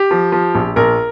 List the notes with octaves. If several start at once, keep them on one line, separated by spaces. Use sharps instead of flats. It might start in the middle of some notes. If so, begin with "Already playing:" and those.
Already playing: G4
F3
F3
A#1
A#1 A#4